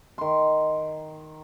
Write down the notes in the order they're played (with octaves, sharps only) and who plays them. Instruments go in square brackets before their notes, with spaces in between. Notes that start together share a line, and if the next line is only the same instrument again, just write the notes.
[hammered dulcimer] D#3 C6